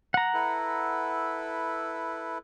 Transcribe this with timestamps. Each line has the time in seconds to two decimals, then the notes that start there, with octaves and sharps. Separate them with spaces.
0.14 F#5 A#5
0.34 E4 A4 B4